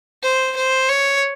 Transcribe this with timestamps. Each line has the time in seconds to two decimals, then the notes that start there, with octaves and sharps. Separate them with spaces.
0.23 C5
0.57 C5
0.89 C#5